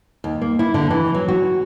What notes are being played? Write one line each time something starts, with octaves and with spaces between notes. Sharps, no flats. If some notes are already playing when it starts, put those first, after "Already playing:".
D#2
A#3
E4
D3
E3
F#3
F#4